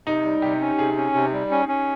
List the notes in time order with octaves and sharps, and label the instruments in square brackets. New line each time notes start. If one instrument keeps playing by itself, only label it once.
[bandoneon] C3 [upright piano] D#4
[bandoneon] G3
[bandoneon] C3 [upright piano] G4
[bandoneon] C#4
[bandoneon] C3 [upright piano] G#4
[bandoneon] C#4
C3
G3
C#4
C#4